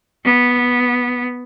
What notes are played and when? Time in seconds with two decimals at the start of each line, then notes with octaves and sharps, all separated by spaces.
0.24 B3